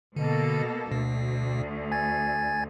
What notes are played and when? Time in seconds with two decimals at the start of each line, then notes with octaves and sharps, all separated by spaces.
0.16 B2 D3 A#3 A4
0.92 D2 B2
1.92 G#5 G#6 A6